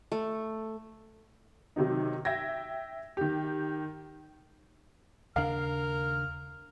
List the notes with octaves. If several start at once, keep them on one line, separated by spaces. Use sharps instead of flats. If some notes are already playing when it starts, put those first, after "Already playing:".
A3
C3 D#3 F#3 D#4
E5 G5 G#6 A#6
D#3 G4
D#2 C#3 D4 A#4 F5 F6